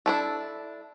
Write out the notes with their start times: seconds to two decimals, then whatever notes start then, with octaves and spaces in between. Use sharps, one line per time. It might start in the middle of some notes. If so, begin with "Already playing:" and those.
0.06 D4 E4 A4